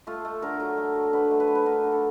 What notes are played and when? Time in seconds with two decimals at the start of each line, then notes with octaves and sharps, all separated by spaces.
0.07 A3 F4
0.25 A3
0.42 D3 A#4
0.60 F#3 A#4
0.77 A3
0.95 F#3
1.13 D3 B4
1.31 A3
1.40 B4
1.48 A3 C5
1.55 B4
1.66 D3 A#4
1.83 D3
1.92 A4